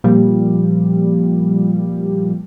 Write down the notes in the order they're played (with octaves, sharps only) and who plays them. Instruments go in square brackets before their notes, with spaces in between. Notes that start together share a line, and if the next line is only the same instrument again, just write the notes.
[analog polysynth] A#2 F3 G3